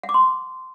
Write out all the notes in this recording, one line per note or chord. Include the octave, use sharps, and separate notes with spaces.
F#5
D6
C6